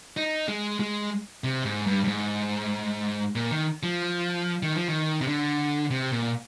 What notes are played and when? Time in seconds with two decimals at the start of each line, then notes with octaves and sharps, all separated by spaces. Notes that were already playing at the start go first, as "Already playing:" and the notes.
0.17 D#4
0.48 G#3
0.80 G#3
1.44 C3
1.65 G#2
1.87 G2
2.04 G2
2.08 G#2
3.36 A#2
3.51 D#3
3.83 F3
4.63 D#3
4.76 F3
4.88 D#3
5.21 C3
5.27 D3
5.91 C3
6.12 A#2